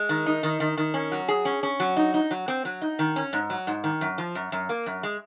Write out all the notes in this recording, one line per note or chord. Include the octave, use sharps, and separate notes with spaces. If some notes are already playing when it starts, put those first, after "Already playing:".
Already playing: G#3
D#3
D#4
D#3
D#3
D#3
C#4
F#3
G#4
C#4
C#4
F#3
D#4
D#4
F#3
C4
F#3
D#4
D#3
C#4
G#2
F#3
G#2
D#3
F#2
F3
F#2
F#2
A#3
F#2
G#3